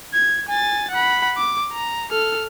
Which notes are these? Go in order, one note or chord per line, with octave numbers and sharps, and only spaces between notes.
G#6
G#5 A6
F#5 B5
D6
A#5
A4 F6